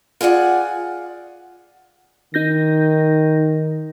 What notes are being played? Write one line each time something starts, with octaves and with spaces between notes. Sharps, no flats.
F4 G#4 D5 F#5
D#3 D#4 G6 A#6